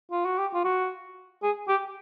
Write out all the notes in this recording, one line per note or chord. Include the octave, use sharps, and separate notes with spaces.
F4
F#4
G4
F4
F#4
G#4
G4